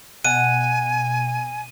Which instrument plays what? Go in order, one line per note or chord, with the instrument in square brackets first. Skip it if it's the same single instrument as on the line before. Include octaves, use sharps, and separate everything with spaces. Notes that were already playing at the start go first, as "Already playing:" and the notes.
[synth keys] B2 [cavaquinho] F#5 [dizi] G#5 [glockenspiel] D#7